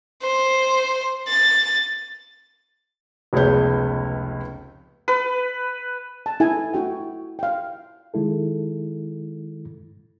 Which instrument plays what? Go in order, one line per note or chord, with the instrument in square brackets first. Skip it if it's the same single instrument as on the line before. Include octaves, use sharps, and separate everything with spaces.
[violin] C5
A6
[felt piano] F1 C#2 C#3 B3 C#5 G6
[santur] B4
[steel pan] A5
E4 A4 G#5
E4 F#4 G5
F5 G5
[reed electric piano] D#3 G#3 E4 A4